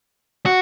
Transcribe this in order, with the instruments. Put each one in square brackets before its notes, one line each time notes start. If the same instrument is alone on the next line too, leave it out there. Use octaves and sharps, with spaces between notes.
[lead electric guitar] F#4